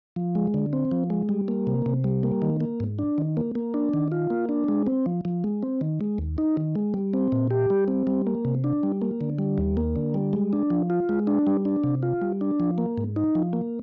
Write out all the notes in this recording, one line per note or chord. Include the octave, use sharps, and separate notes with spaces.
F3
G#3
D3
C4
F3
G#3
G3
A#3
C3
C3
G3
A#3
D#3
A#3
G#2
D4
D#3
A#3
A#3
D4
D#3
F4
A#3
D4
G#3
C4
F3
F3
G#3
C4
D#3
G#3
D#2
D#4
D#3
G#3
G3
C4
A#2
G4
G3
C4
G3
A#3
C3
D4
G3
A#3
D3
G3
D#2
A#3
D3
G3
G#3
D4
F3
F4
G#3
D4
G3
D4
C3
F4
G3
D4
F3
A#3
G#2
D#4
F3
A#3